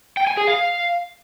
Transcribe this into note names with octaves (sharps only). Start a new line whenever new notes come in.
G5
G#5
G#4
F5